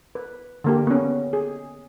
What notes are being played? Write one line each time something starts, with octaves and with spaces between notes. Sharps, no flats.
B4
D3 A#3 G4
B3 C#4
G#4